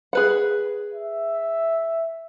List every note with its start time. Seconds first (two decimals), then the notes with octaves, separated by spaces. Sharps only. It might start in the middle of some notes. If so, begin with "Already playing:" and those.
0.13 G#4 B4 F#5
0.94 E5